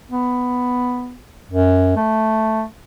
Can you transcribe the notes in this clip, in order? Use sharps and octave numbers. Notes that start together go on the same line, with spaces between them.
B3
F#2
A3